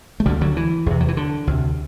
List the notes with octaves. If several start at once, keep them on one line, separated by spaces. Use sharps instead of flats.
A3
D2 D3 E3 G3
D3 F#3
E3
E2 C3
F#3
E3
D3
D2 C3